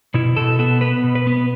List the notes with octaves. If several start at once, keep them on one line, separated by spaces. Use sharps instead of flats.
B2 E4
B2 A4
B3 A4
B3 B4
B2
B4
B3